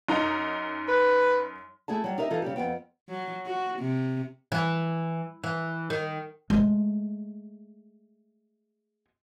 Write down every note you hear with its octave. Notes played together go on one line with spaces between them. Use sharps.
F#2 D#4 A#5
B4
A3 E4 G#4 A5
F#3 G3
D#4 G4 A#4 E5
E3 D#4 F4 A4
C#3 G3 G4
F2 G#2 B3 G5
F#3
F#4
C3
E3
E3
D#3
G#3 A3